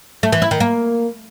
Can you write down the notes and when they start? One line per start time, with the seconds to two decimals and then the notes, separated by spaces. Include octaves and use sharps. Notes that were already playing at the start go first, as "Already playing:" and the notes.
0.23 A3
0.32 E3
0.42 E4
0.51 D#3
0.60 A#3